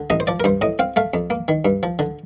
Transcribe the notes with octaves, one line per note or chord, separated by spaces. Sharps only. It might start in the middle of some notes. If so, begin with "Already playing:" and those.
Already playing: D3
A1 D#5
C5
F3 D5
A#4
G2 C5
A2 D#5
C4 F5
A3 F5
F2
A#3
D#3
G2
F3
D3